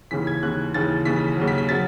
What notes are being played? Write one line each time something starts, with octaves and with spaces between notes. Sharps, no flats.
D#2 C#3 E3 B6
G#6
D#2 C#3 E3 F#6
D#2 C#3 E3 A6
D#2 C#3 E3 B6
D#2 C#3 F#3
B6
B6
C#3 F#3 A6